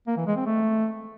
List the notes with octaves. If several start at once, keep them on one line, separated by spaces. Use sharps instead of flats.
A#3
E3
G#3
C4
A3